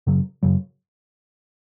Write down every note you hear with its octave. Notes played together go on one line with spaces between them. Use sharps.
F#2 C#3 F#3
F#2 C#3 F#3